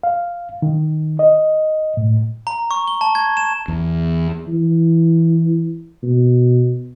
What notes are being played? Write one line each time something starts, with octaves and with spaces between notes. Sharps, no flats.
F5
D#3
D#5
A2
A#5
C#6
G7
A5
G#6
E7
E2
E3
B2